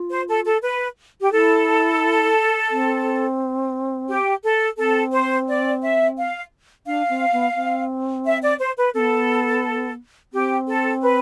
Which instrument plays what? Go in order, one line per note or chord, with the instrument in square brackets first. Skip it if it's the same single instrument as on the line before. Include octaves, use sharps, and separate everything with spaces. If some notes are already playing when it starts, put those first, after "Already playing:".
Already playing: [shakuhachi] F4
[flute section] C5
A4
A4
B4
G4
[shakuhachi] E4 [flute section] A4
[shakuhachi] C4
[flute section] G4
A4
[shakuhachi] C4 [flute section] A4
[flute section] C5
D5
E5
F5
[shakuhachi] D4 [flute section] F5
[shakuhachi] C4
B3
C4
[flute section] E5
D5
C5
B4
[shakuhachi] C4 [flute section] A4
[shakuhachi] B3
[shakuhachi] C4 [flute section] G4
[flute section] A4
B4